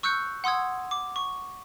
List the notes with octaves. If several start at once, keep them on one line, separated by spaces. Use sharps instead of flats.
C#6 E6 F#6 G6 C#7
F#5 C6 D#6 E6 G#6
D6
C#6